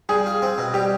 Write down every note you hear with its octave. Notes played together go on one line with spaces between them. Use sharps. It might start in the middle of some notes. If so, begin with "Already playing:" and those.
G3 G#4
F4
C4
B2
G3 G4